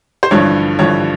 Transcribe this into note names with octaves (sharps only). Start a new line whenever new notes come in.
C5
A1 G2 D3 F3 C#5
A1 G2 D3 F3 C#5